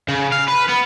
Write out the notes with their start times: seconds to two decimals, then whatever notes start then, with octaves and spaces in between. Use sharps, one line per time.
0.08 C#3
0.32 F5
0.48 B4
0.68 B3